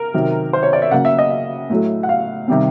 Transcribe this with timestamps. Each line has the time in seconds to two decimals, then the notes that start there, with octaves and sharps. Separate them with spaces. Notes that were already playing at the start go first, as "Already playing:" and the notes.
Already playing: A#4
0.14 C3 D#3 F#3
0.53 C5
0.63 C#5
0.73 D5
0.82 E5
0.91 C#3 F#3 A#3 F#5
1.05 E5
1.19 D#5
1.31 E5
1.70 A2 F#3 A3
2.03 F#5
2.09 F5
2.48 C3 D#3 G3 C4